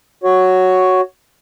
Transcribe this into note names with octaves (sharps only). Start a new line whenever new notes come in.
F#4 C#5